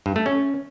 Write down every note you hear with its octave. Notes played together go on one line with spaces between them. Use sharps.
G2
A3
C#4